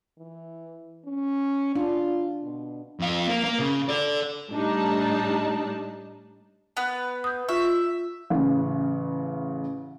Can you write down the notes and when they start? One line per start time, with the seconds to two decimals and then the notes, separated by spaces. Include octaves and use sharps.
0.18 E3
1.05 C#4
1.75 D4 F4
2.43 B2
3.00 F2 F5
3.27 A#3
3.44 A#3
3.59 C#3
3.89 A4 D5
4.51 A2 G3 D4 D#4 A5
6.77 B3 B4
7.24 D#6 G6
7.49 F4 E5 C#6
8.30 A1 C#3